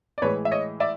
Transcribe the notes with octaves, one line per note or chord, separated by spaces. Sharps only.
D5
A2 E3 G#3 B4 C#5
E5
C#5 D#5
D5 E5